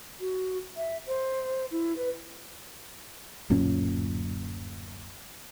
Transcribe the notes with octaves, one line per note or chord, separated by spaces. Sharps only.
F#4
E5
C5
E4
B4
D1 F#2 A#2 C#4